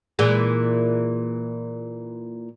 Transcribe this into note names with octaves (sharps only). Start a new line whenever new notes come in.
A#2 E3 G#3